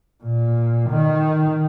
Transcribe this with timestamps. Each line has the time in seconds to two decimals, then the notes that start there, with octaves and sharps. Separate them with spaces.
0.24 A#2
0.90 D#3